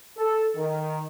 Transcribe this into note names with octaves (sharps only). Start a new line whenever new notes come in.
A4
D#3